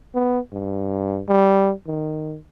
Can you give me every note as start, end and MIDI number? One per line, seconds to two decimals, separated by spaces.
0.14 0.40 59
0.53 1.22 43
1.28 1.72 55
1.87 2.37 51